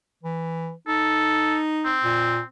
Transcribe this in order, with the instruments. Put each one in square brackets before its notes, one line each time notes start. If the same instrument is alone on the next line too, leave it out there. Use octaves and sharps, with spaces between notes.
[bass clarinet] E3
[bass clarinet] D#4 [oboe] A4
[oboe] C4
[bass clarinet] A#2